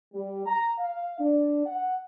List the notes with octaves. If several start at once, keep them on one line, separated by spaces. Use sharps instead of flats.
G3
A#5
F5
D4
F#5